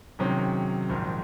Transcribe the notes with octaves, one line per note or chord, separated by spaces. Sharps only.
C3 D#3 F#3 C#4 G#4
A#1 G#2 D#3